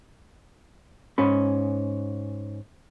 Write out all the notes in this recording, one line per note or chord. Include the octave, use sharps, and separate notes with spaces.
G#2 C#4 B5